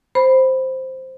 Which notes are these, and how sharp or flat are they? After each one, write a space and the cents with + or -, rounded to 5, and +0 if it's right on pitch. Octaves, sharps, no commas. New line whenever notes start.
C5 +0 B5 +0